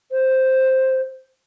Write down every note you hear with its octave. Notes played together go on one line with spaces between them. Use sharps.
C5